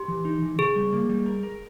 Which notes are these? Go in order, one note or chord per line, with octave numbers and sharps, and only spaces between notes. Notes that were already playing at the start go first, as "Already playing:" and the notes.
Already playing: G4
E3
D#4
E3
C#3 G#4
G3
A#3
G3
A#4
A#4